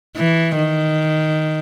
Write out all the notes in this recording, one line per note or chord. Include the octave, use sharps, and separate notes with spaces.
E3
D#3